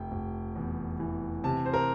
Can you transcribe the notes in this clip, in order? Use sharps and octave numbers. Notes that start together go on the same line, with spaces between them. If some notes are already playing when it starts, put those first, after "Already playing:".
Already playing: F1 G5
F1
E2
E3
C3 A5
C5
A#4